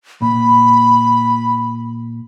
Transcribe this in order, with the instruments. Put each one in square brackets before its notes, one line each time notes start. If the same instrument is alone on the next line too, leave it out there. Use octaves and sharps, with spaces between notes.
[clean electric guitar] A#2 [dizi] B5